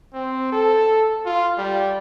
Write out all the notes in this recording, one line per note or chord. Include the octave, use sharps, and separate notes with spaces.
C4
A4
F4
G3